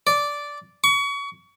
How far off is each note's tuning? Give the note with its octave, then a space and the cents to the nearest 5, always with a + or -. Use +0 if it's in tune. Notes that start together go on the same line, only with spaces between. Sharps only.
D5 -10
C#6 +30